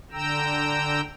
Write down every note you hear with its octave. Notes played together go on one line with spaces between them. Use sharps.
D3 G5 A#5 E6